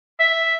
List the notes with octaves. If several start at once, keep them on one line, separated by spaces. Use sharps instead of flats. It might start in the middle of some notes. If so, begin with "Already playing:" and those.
E5